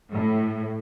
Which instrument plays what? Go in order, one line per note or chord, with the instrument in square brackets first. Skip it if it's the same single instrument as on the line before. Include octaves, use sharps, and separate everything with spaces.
[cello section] A2